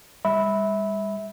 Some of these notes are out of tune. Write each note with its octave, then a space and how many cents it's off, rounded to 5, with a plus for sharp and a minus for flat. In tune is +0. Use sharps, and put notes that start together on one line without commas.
G3 +40 E5 -20 B5 +0